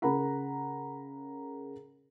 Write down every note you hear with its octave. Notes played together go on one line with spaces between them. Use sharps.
C#3 A#4 F#5 A#5 B5